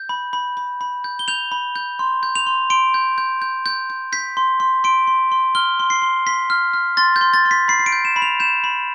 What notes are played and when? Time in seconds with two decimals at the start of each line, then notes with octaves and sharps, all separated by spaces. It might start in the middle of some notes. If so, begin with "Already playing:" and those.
Already playing: G6
0.09 B5
0.33 B5
0.57 B5
0.81 B5
1.04 G6
1.19 G7
1.28 G6 F7
1.52 B5
1.76 G6
1.99 C6
2.23 G6
2.35 F7
2.46 C6
2.70 C6 D7
2.94 G6
3.18 G6
3.42 G6
3.66 G6
3.90 G6
4.12 G6 B6
4.37 C6
4.60 C6
4.84 C6 D7
5.07 C6
5.32 C6
5.55 F6 G7
5.80 C6
5.90 C7
6.02 C6
6.27 C6 B6
6.50 F6
6.74 F6
6.97 C6 A6
7.16 G6
7.21 C6
7.34 A6
7.45 C6
7.51 B6
7.68 B5 C7
7.79 C7
7.86 D7
7.92 G6
8.05 E7
8.16 B5
8.22 F7
8.40 G6 E7
8.64 B5